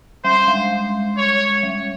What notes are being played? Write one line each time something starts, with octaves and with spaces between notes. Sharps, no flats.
G3 C5
G#3
C#5
G3